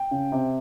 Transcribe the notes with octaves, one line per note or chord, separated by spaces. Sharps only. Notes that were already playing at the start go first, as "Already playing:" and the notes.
Already playing: G5
C#3
C3